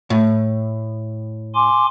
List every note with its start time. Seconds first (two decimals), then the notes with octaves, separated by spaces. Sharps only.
0.10 A2
1.55 G#5 C6 D6